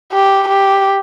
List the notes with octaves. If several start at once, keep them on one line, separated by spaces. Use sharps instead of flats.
G4
G4